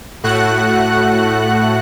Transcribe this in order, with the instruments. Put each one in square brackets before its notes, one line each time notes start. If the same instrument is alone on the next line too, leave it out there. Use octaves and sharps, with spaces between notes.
[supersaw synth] A2 A3 F#4 F#5 F#6